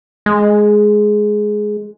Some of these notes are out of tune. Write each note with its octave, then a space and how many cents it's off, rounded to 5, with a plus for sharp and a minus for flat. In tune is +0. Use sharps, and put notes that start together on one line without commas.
G#3 +10